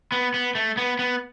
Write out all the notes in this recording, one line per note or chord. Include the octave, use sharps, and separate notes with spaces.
B3
B3
A3
B3
B3